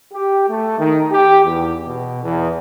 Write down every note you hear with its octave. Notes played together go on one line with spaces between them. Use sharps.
G4
A3
D#3
G4
E2
B2
E2